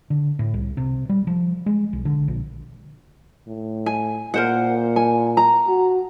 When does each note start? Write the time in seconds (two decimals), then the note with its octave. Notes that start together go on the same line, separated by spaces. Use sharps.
0.10 D3
0.39 A2
0.54 C2
0.77 C3
1.09 G3
1.27 F3
1.66 G#3
1.93 B1
2.05 D3
2.28 A#1
3.47 A2
3.86 G#5
4.34 A#2 A#4 C5 F#5
4.96 G#5
5.37 A#5
5.68 F#4